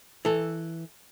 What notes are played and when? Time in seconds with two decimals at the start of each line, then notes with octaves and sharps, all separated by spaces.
0.25 E3 A4